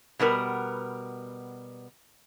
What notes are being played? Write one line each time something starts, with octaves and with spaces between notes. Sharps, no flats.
B2 G3 B3 A#4